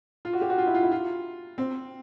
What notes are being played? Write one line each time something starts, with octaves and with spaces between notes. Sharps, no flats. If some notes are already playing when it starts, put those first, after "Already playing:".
F4
F#4
G4
F#4
F4
E4
F4
E4
F4
C4